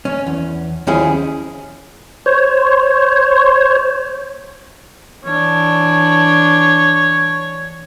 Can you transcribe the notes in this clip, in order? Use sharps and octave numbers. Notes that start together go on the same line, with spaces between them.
C#4
E2
D#2 F3 C#4 E4 G#4
C5 C#5
E3 D4 C#5